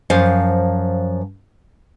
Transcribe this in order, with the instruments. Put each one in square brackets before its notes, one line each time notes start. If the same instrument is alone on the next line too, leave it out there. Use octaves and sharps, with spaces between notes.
[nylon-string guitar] F#2 F3 C5 F5